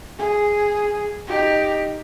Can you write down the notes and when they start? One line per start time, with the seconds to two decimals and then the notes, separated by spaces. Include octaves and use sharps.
0.18 G#4
1.27 D#4 G4